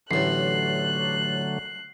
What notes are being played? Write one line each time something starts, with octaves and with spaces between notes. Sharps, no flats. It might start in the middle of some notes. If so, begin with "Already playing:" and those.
A1 A2 D3 F#3 A3 F#6 C7